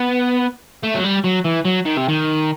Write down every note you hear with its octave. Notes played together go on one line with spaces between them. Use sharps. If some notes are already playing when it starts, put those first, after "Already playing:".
Already playing: B3
A3
F#3
G3
F#3
E3
F#3
D#3
C3
D#3